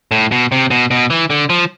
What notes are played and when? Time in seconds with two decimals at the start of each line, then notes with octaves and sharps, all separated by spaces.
0.11 A2
0.32 B2
0.52 C3
0.71 B2
0.91 B2
1.10 E3
1.30 D3
1.50 F3